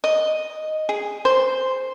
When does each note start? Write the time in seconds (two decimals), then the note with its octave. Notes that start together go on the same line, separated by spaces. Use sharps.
0.04 D#5
0.89 G#4
1.25 C5